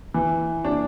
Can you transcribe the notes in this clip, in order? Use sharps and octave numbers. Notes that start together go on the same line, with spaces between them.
E3
D4